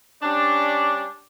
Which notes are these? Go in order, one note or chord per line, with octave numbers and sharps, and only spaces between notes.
G3 C#4 D4